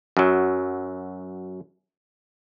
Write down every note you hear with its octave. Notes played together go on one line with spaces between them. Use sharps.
F#2 F#3